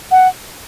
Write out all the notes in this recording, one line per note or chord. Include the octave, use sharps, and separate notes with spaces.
F#5